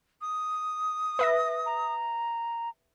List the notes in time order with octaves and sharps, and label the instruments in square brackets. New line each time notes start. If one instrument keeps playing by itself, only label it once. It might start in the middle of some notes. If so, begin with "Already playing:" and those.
[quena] D#6
[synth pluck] B4 E5 A#6
[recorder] A#5